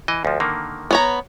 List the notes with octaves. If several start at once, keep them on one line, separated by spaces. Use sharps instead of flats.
E3 D#5
D2 F3
D3 D#3 A#3
B3 C#5 A#5